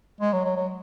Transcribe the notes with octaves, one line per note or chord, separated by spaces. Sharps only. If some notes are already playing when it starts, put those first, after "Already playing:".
G#3
F#3
F#3
F#3